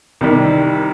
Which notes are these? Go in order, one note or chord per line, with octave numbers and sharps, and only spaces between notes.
C2 C3 D#3 G3